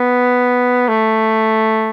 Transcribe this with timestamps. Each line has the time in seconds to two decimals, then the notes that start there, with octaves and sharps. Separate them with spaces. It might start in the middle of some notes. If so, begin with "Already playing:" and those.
Already playing: B3
0.88 A3